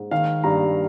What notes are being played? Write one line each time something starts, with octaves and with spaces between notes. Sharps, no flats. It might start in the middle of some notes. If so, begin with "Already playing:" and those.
Already playing: G#2
D#3 F5
G2 A#5